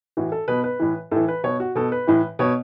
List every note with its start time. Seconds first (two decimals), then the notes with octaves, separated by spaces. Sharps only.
0.17 A2 E3 F#4
0.32 A4
0.48 B2 B4
0.64 B4
0.80 A2 E3
1.11 A2 E3 A4
1.28 B4
1.44 B2 C#5
1.60 F#4
1.75 B2 A4
1.92 B4
2.07 A2 E3
2.39 B2 C#5